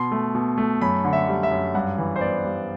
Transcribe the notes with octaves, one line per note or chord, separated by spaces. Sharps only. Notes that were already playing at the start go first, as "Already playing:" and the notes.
Already playing: B2 C6
A3
B2
A3
F#2 B5
D3
E5
G3
E5
F#2
G2 F#5
E3
C5
B3 D5
G2